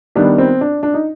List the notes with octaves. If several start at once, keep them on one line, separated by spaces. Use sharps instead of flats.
D#3 G3 B3 D4
C4
D4
D4
D#4